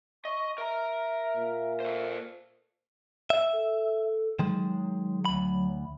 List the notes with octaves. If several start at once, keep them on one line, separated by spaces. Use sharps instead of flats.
D#5 C#6
A#4 E5 A#5
A#2
A4 C5
E5
A4
D#3 F#3 G#3
D2 B5